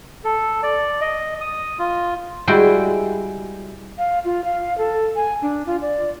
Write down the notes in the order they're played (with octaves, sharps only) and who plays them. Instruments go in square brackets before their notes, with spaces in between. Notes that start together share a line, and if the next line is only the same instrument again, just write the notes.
[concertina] A4
D5
D#5
D#6
F4
[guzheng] G3 G#3 E4 F#4 G5
[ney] F5
F4
F5
A4
G#5
D4
F4
D5